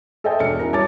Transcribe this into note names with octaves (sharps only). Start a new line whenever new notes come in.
A4 C5 D#5 E5 G5 G#5
E1 D4 F6 C#7
C#4 E4 F#4 A#4
G3 C#5 G#5 A5 D6 A6